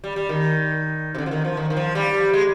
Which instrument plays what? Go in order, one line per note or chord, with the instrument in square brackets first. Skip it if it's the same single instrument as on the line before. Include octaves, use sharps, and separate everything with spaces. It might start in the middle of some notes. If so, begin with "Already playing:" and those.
[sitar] G3
G3
D#3
C3
D3
F3
D#3
F3
D#3
D#3
F3
G3
G#3